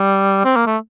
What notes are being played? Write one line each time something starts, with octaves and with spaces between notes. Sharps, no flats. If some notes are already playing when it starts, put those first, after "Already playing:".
Already playing: G3
C4
A#3
A3